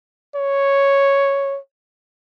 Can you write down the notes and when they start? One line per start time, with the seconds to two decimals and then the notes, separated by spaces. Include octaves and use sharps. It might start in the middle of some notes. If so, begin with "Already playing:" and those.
0.35 C#5